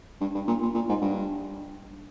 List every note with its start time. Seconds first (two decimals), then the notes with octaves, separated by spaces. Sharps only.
0.21 G2
0.34 G2
0.47 A#2
0.62 A#2
0.74 A#2
0.89 G#2
1.01 G2